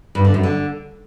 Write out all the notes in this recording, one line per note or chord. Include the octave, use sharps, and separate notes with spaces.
G2
D3
F#2
D3